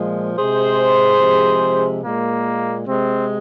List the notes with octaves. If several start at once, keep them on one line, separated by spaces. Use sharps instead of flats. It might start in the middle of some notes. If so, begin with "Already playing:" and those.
Already playing: A#2 F3 G#3
C3 G#3 G#4 C5
C3 F3 G#3
A#2 G#3 A#3
C3 G#3 C4